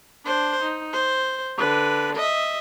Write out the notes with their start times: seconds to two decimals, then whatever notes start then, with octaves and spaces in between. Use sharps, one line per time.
0.25 D4 C5
0.62 D#4
0.93 C5
1.57 D3 B4
2.16 D#5 E5